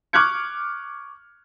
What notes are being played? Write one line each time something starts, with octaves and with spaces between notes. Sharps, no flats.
C#6 D6 F6 F#6 G#6 C#7